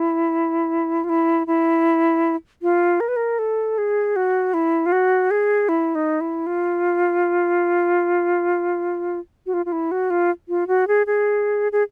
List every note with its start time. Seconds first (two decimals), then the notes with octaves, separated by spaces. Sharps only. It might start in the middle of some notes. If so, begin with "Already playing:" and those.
Already playing: E4
1.04 F4
1.09 E4
1.47 E4
2.62 F4
3.00 A#4
3.08 B4
3.16 A#4
3.39 A4
3.78 G#4
4.16 F#4
4.54 E4
4.86 F4
4.92 F#4
5.31 G#4
5.69 E4
5.95 D#4
6.21 E4
6.47 F4
9.46 F#4
9.54 F4
9.66 F4
9.72 E4
9.91 F#4
10.10 F4
10.49 F4
10.68 F#4
10.88 G#4
11.07 G#4
11.72 G#4